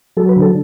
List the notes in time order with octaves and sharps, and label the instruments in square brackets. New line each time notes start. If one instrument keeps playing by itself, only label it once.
[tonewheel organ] F#3 A4
B4
D3
A4